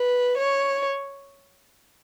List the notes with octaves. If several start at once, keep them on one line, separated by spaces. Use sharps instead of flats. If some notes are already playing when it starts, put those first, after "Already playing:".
Already playing: B4
C#5